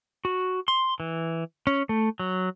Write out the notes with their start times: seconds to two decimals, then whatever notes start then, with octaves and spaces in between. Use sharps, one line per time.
0.25 F#4
0.68 C6
1.00 E3
1.67 C#4
1.89 A3
2.19 F#3